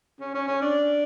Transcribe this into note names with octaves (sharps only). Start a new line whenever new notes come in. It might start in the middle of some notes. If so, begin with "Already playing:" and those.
C#4
C#4
C#4
D4